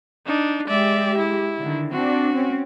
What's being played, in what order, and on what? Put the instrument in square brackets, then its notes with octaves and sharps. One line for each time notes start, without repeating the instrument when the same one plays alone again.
[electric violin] D4 D#4
[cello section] G#3 G4 [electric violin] D5 E5
[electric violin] E4
[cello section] D3 D#3
[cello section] C4 D4 [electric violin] F#4
[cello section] C4 C#4